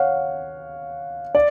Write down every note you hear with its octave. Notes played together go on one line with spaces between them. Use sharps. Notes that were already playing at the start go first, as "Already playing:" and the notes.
Already playing: C#5 F5 F#5
D5